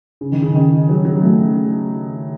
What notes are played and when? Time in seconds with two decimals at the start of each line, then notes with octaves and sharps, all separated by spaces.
0.21 C#3
0.32 D#3
0.42 C#3
0.55 D#3
0.89 F#3
1.05 F#3
1.23 A3